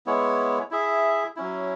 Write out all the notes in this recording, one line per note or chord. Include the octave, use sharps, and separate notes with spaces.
G#3 B3 E4 C#5
E4 G#4 E5
F#3 C#4 E4